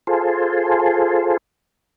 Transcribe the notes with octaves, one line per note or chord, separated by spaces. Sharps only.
F4 G#4 A4 C5